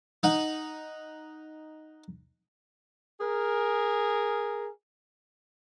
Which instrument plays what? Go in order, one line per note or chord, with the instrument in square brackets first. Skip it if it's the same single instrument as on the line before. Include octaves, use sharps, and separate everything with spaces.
[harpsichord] D#4 F#5
[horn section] G#4 A#4